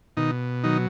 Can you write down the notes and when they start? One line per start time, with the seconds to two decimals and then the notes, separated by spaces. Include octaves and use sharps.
0.17 B2 D#3 D#4
0.63 D#3 F#3 D#4